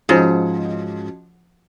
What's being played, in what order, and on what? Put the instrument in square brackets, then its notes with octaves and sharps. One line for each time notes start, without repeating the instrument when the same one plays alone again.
[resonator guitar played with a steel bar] G#2 [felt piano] F3 [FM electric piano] C#4 F#4 D#5 [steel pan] G#4 C5